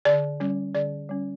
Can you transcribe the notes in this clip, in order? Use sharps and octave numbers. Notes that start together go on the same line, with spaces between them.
D3 D5
G3 C#4
D3 D5
G3 C#4